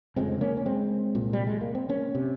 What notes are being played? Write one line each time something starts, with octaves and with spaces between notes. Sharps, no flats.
F1 F2 C#3 G#3 C4
A#3 C#4
C#4
G#3 C4
C2 A#2
G3
G#3
A#3
C4
A#3 C#4
C3